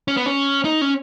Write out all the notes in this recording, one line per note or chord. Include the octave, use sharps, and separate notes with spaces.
C#4
B3
C#4
D#4
C#4